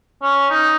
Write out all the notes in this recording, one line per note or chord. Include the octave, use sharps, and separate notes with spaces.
C#4
D#4